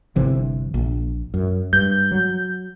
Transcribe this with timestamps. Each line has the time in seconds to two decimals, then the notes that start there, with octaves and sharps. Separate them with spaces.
0.16 G1 C3 E3
0.74 A#1
1.34 F#2
1.73 G2 G6
2.11 F#3